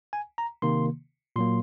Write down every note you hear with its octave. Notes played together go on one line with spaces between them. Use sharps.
G#5
A#5
C3 D#3 A#3 C6
A#2 F#3 A#3 C6